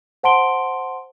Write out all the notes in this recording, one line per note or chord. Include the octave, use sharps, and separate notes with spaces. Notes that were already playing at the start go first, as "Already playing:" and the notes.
C5 F#5 A5 C6 D7 G7